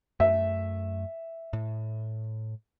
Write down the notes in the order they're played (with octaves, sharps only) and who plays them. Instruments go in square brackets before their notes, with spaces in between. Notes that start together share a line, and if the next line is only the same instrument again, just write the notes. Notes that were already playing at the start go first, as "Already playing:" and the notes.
[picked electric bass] F#2 A3 [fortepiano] E5
[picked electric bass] A2